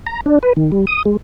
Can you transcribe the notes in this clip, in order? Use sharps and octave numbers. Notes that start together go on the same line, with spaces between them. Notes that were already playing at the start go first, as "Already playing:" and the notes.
A#5
D4
B4
D#3
G3
D#6
G#3